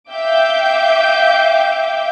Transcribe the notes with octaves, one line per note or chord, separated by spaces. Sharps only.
E5 F5 G5 D6 G6